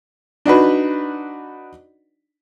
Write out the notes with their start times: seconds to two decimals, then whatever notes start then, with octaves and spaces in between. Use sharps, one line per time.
0.46 D4 D#4 F#4 B4